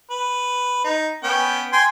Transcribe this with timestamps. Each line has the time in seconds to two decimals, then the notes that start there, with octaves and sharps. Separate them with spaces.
0.10 B4
0.84 D#4
1.23 B3 C#4 G5
1.73 G5 G#5 C6